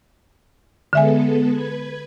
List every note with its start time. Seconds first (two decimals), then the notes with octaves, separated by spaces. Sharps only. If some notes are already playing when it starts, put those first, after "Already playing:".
0.93 D3 G#3 B3 A4 E5 G#5
1.50 B4 G#6